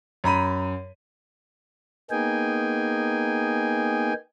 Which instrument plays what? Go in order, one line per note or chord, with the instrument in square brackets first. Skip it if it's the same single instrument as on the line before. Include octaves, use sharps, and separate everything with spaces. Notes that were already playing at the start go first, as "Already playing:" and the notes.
[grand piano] F#2 A#5 B5 D#7
[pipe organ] A#3 B3 D#4 G#4 G5 G#5